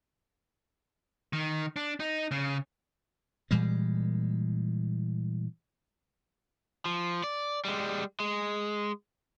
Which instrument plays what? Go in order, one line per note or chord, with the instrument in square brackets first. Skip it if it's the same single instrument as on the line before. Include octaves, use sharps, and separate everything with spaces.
[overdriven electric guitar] D#3
D4
D#4
C#3
[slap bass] A#2 E3 G3 G#3
[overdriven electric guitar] F3
D5
G3 G#3
G#3